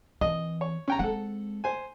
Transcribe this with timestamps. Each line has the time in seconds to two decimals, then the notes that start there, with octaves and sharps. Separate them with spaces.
0.21 E3 C4 D#5
0.61 C#5
0.88 C#4 G5 A#5
0.99 G#3 C4 A4 F#5
1.64 C5 G#5